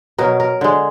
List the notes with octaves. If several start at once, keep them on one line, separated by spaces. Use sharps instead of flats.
B2 F#3 A#4
A#4
D3 G#3